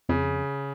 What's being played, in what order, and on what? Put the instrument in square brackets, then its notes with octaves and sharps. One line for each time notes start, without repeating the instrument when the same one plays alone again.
[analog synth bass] F2 [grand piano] C#3